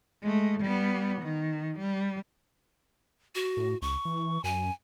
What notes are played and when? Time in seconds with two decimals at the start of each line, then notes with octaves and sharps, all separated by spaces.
0.22 G#3 A3
0.61 G3 B3
1.22 D#3
1.79 G3
3.35 F#4
3.57 A2
3.82 C#2 C#6
4.05 E3
4.44 F#2 G#5